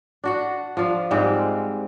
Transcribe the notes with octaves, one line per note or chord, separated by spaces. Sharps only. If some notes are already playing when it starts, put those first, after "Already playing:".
D4 F#4 F#5
F3 D4 F4
G#2 G3 G#3 C4